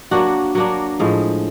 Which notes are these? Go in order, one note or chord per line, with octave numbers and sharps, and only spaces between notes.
F#3 A#3 D4 F#4
F#3 A#3 D4
A2 F3 G#3